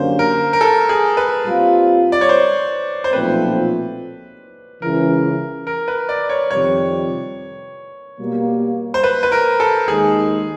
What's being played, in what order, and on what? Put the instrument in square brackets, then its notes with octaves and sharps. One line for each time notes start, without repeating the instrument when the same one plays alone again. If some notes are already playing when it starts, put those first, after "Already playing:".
Already playing: [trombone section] F#2 D3 G3 A#3 C#4 [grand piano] C5
[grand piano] A#4
A#4
A4
G#4
B4
[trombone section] A#2 G3 C4 F4
[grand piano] D5
C#5
C5
C5
[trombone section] B1 A#2 F3 A3 C4 [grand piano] B4
[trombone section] C#2 C#3 E3 [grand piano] A#4
[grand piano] A#4
B4
D5
C#5
[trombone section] F2 C3 D#3 G3 [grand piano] C#5
[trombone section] B2 G3 A#3
[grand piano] C5
B4
B4
A#4
A4
[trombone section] D#2 D#3 G#3 [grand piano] G#4